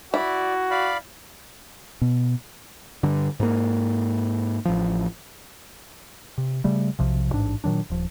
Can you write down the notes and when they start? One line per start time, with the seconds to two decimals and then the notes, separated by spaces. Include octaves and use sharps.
0.14 E4 F#4 D5
0.71 D5 F5 B5
2.01 B2
3.03 G2 D3
3.40 G#2 A#3
4.65 A1 F3
6.38 C3
6.64 C#3 G3 A3
6.99 B1 C3 F3
7.31 A1 G#2 D4
7.64 A#2 D#3 F#3 D4
7.90 D#1 F3